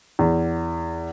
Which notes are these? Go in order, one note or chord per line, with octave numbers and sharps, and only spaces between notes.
E2